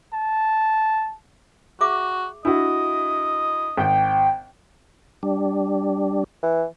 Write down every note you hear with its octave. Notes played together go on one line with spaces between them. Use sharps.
A5
F#4 G#4 E5 D6
D4 E4 F#4 D#5
G#1 G5
G3 D4
E3